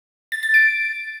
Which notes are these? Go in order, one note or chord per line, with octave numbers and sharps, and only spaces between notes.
A6
A6
D7